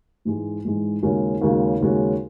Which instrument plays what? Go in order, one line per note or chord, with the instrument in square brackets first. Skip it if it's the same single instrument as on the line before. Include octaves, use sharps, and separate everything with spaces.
[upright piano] G#2 E3 G#3
G#2 E3 G#3
D#2 C#3 G#3 C#4 F#4
D#2 C#3 G#3 C#4 F#4
D#2 C#3 G#3 C#4 F#4